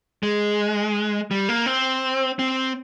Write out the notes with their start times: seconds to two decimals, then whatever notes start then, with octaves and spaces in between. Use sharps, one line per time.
0.23 G#3
1.31 G3
1.49 A#3
1.66 C4
2.39 C4